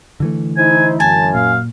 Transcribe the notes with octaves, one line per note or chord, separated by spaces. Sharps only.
D3 E3 A3
D#4 E4 C5 G#5
F#2 G#5 A5
A#2 F5